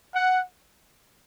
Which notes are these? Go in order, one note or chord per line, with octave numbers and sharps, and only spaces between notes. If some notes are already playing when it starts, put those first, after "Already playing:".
F#5